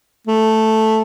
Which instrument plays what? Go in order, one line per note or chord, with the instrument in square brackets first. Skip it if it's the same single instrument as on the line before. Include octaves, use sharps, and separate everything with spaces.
[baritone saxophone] A3